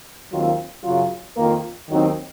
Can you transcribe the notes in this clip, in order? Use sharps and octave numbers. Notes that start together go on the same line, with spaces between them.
D#2 D#3 F#3 C4 F4
F#2 C#3 F#3 C#4 F4
F2 D#3 A#3 F4 A#4
D#2 D#3 F#3 C4 D#4